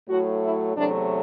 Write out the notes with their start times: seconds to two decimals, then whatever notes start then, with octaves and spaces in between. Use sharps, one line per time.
0.09 A2 F#3 A3 F#4
0.42 E4
0.75 E2 C3 F#3 A3 D4